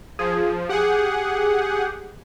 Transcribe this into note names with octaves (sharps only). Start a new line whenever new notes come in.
F3 G#4
G4 G#4 F#5